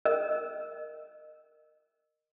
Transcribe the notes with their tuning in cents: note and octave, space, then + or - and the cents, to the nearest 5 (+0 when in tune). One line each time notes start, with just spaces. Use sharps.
A#4 -5 D#5 -20